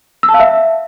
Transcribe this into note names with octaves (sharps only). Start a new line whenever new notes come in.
E6
A5
F5
E5